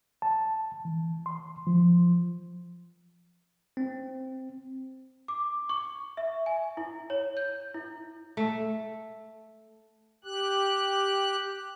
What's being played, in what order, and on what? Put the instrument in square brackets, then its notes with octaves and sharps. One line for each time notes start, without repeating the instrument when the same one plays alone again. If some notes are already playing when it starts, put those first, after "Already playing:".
[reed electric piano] A5
E3
C6
F3
[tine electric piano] C4
[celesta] D6
C#6
E5
G#5
E4
C#5
G6
E4
[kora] A3
[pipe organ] G4 F#6